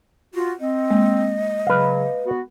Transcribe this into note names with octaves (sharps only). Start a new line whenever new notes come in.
F4 F#4
C4 D#5
G#3 A#3
C#3 F#3 B4 F5
B3 F#4